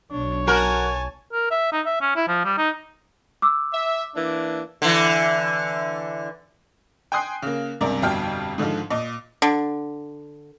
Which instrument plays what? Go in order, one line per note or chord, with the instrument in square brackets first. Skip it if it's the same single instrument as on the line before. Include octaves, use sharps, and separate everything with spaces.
[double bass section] B1 [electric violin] D4 [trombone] C#5
[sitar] F#4 A#4 [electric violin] G#5 A5
[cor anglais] A#4
E5
D#4
E5
C#4
E4
F3
G3
D#4
[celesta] D6 E6
[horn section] E5
E3 A#3 D4
[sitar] D3 E3
[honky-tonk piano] G5 G#5 C6 D#6 F#6 C7
C#3 A#3
C#2 G2 C3 A#4 D5 A#5
G1 F2 B2 G3 G5 F6
G#2 D3 D#3 F3
A#2 D#5
[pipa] D3